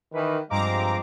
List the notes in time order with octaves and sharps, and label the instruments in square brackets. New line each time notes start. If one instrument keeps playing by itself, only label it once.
[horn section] D#3 E3 B4
[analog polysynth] G2 A#5 D6 [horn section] F3 G#3 C4